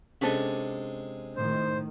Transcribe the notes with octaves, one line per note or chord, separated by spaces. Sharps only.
C3 G#3 C#4 D4 A4
A2 D#3 C5